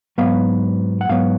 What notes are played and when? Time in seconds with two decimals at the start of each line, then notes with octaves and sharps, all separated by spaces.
0.18 G#2 F#3 B3 F5
1.01 F#5
1.09 G#2 F#3 B3 F5